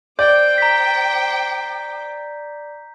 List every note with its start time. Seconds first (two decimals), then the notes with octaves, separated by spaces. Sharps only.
0.19 C5 D5 G5 D6 G6
0.58 A#5 B6